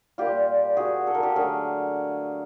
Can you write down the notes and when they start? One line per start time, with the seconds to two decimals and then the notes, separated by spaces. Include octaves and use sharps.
0.18 A#2 G3 F4 G4
0.77 F#4 G#4
1.07 A4
1.15 A#4
1.23 G4 A4
1.35 D3 F#3 A3 G#4 A#4